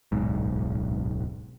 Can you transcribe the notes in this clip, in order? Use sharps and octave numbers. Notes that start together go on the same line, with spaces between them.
D1 B1 G#2